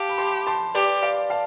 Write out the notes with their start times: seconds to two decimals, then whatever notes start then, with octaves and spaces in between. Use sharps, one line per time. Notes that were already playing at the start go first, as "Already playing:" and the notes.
Already playing: G4 F5 A5
0.09 B5
0.18 A5 C6
0.47 A5 C6
0.75 G4 B4 D5
1.02 D5 F5
1.30 F5 A5